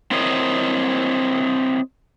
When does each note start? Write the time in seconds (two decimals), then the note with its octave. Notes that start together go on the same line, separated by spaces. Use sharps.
0.11 C4 E4 A#4 C5 C#5 D#5